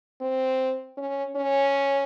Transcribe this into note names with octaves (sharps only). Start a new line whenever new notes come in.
C4
C#4
C#4